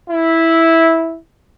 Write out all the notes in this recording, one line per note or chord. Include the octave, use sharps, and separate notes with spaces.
E4